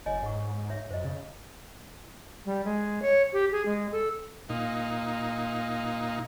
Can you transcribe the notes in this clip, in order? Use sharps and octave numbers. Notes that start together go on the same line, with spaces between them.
F#1 C#5 D#5 G#5
G#2 F#5 C#6
C#5 E5
F#2 C5 D#5
C#3
G3
G#3
C#5
G4
G#4
G#3
A4
A#2 D#4